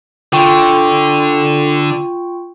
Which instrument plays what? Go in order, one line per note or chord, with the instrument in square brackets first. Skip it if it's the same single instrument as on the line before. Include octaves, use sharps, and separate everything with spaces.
[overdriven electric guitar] D3 [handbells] F4 G5 C#6